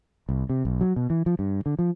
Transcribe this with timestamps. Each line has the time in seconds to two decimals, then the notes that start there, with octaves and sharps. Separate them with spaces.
0.29 C2
0.50 C3
0.65 B1
0.81 F#3
0.96 B2
1.10 E3
1.26 F3
1.39 G2
1.66 D3
1.79 F3